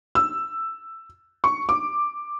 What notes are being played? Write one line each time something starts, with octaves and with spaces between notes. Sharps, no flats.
E6
C#6
D6